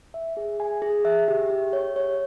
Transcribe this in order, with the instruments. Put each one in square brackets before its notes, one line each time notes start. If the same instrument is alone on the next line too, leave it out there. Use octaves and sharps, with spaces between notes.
[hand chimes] E5
G#4
G#5
G#4
E5
G4
G4
C#5
C#5